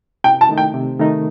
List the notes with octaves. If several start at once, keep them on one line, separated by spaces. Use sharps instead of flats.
C3 G5
A5
D#3 A3 D#4
G5
C3
D#3 A3 D#4